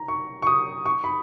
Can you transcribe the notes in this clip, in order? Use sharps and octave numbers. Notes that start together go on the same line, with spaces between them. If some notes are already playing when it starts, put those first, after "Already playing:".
Already playing: A#5
C#6
C#6
D#6
C#6
B5